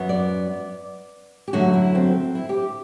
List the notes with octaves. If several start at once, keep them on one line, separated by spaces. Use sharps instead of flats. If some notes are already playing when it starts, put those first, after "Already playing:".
Already playing: F#2 F#3 B3
D5
G4
F#2 D3 F#3 A3 F#4
E4
C4
E4
G4